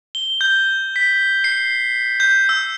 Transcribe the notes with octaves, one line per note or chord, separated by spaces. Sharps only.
G7
G6
B6
C7
G6
E6